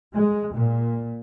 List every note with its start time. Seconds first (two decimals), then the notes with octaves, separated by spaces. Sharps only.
0.14 G#3
0.54 A#2